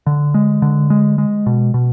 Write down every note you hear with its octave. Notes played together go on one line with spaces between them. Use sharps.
D3
G#3
D3
G#3
G#3
B2
B2